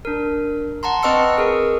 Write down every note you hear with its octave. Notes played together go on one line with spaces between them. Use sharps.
D4 A#4
F#5 A5 A#5 C6
C4 B4 D#5 C#6 E6 C#7
G#4 A#4